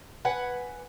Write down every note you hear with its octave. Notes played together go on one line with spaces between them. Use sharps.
B4 F#5 G#5